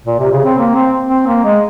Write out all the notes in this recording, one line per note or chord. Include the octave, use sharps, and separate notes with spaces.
A#2
C3
C#3
C4
A#3
C4
C4
A#3
G#3